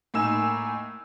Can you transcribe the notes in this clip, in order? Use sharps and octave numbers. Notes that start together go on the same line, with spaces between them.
A2 A#3 D#4 G#5 E6 E7